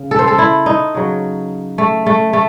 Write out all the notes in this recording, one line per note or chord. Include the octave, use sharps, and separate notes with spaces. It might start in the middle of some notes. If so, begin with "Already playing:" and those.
Already playing: C#3
A4
C5
A4
E4
D#4
C#3 F#3
A3
A3
A3